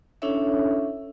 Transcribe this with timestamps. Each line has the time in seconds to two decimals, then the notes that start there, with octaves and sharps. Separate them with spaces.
0.22 C#4 D4 E4 A4 C#5 E5